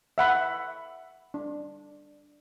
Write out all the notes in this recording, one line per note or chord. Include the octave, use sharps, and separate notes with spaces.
E5 F#5 B5
D4